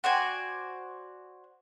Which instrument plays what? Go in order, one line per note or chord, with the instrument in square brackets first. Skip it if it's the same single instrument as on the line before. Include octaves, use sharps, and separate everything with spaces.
[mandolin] F#4 C5 D5 G#5